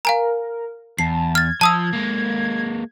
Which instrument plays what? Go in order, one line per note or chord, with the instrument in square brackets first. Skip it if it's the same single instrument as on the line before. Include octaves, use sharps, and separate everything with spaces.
[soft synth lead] A#4 [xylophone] F5 G#5 A#5
[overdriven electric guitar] E2 [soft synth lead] A5 [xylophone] C7
[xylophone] F6 A6 [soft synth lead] G#6
[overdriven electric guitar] F3 [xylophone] A5 D#6 E6
[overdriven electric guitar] G#3 A#3